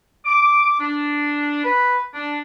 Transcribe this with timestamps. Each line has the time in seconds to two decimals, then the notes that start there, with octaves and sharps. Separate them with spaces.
0.25 D6
0.80 D4
1.64 B4
2.13 D4